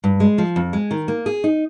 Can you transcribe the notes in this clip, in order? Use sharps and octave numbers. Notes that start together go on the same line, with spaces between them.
G2
G#3
F3
F2
G#3
D#3
A#3
G#4
D#4